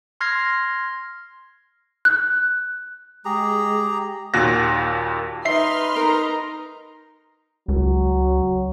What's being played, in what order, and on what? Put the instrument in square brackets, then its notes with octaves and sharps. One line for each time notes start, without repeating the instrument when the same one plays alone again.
[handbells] C6 F6 G#6 A#6 C7
[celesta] F#6
[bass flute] G#3 [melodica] G4 G#4 A#5
[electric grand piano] D#2 A#2 F#4 F#6 A#6
[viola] D#4 [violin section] B4 C6 F6 [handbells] E5 C7
[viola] D#4 A#5 [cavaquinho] A#4
[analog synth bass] C#2 [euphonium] F#3